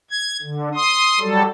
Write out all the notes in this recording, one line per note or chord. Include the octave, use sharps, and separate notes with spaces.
G#6
D3
C6 D#6
F#3 G3 A4